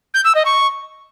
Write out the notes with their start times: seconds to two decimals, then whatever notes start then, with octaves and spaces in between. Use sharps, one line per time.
0.14 G6
0.25 E6
0.35 D#5
0.45 C#6